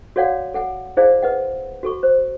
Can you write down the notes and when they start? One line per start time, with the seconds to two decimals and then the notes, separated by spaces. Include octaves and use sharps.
0.16 F#4 A4 C#5 D5 F5 F#5
0.54 A4 F#5 G#5
0.97 E4 G#4 C5 D5 F5
1.23 B4 D#5 F#5
1.83 F#4 A4 C#6
2.03 C5